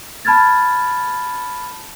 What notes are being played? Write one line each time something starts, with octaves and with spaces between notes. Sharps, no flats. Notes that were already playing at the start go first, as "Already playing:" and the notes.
A5 B5 F6 G#6 A6